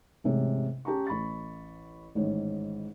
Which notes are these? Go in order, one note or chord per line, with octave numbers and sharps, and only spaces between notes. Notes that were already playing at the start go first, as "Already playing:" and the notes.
A1 G#2 C3 G#4 C#5
C#4 G4 A5 A#5 C#6
A1 B5 C#6 A6
A1 G#2 D#3 C#5